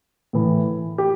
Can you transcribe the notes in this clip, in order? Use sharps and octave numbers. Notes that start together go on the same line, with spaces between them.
A2 E3
G4